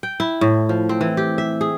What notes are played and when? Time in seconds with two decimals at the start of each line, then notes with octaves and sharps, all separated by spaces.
0.03 G5
0.20 E4
0.41 A2
0.69 F3
0.89 C4
1.01 E3
1.17 G4
1.38 E5
1.61 G#4